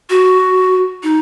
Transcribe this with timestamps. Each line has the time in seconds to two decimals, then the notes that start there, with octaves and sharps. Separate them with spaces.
0.10 F#4
1.03 D#4